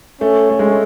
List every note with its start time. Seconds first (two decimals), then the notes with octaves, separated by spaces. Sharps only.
0.21 A3 C#4
0.50 A3
0.59 G#3
0.69 A3